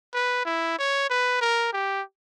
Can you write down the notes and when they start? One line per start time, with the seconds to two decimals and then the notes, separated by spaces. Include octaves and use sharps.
0.14 B4
0.46 E4
0.78 C#5
1.10 B4
1.41 A#4
1.73 G4